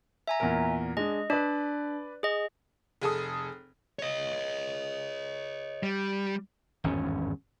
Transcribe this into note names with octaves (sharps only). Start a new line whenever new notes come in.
E5 G#5 A#5
E2 A#2 A#4
G#3 D4 D#5
D4 B4 D5
G#4 D#5
F1 G#4 A4 D#6
C#5 D#5
G3
G#1 E2 G2 C#4